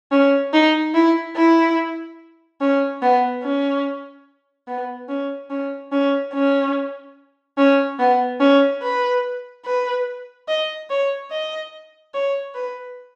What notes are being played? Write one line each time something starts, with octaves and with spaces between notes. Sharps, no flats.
C#4
D#4
E4
E4
C#4
B3
C#4
B3
C#4
C#4
C#4
C#4
C#4
B3
C#4
B4
B4
D#5
C#5
D#5
C#5
B4